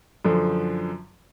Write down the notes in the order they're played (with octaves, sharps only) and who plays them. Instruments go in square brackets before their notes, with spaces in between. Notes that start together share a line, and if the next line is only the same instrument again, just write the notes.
[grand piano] F#2 D3 F3